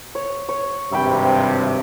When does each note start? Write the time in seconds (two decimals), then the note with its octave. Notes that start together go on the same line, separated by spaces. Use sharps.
0.15 C#5
0.49 C#5
0.92 G#1 G2 C3 G5 B5 E6